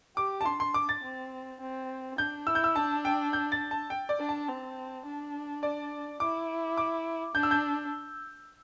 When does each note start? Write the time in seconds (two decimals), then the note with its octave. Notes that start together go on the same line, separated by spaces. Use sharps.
0.17 G4 D6
0.41 A5
0.46 D4 C6
0.60 C6
0.74 D6
0.89 A6
1.03 C4
1.60 C4
2.18 D4 G6
2.47 E4 E6
2.55 G6
2.64 E6
2.75 D4 A5
3.05 G5
3.33 G6
3.52 A6
3.71 A5
3.90 G5
4.09 D5
4.19 D4
4.29 A5
4.48 C4
5.05 D4
5.63 D5
6.20 E4 D6
6.78 D6
7.35 D4 G6
7.43 E6
7.51 G6